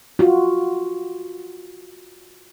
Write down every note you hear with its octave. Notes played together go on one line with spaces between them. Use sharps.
F4 F#4